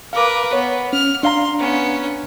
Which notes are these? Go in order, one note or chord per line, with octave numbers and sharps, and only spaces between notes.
A#4 B4 F5 D6
B3 C#5
C#4 F6
D4 F5 A#5 C6
B3 C#4